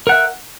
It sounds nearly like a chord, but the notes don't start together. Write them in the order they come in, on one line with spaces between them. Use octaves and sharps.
A#4 F#5 E5